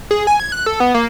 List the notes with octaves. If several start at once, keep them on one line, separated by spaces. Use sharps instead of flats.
G#4
G#5
G#6
F#6
A4
B3
A#3